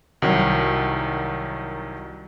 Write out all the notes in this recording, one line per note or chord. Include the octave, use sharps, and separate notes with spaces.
C2 D#3 F#3